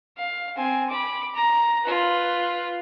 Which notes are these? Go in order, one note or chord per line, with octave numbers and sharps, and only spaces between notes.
F5
C4 G#5
B5 D6
A#5
F4 B4